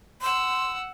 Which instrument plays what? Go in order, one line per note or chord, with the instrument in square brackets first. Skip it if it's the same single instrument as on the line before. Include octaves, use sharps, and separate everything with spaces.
[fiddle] F#5 E6 [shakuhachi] C6